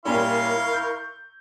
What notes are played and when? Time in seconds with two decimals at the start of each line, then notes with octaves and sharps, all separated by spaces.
0.05 A#2 G3 C#4 E4 A#4 F5 C6 C#6
0.73 G6